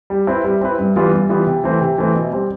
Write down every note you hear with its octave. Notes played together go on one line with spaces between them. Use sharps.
G3
C4 E4 B4
G3
C4 E4 B4
G2
E3 G3 B3 F4
G2
E3 G3 B3 F4
C3
E3 A3 C4
C3
E3 A3 C4
B2
G3 C4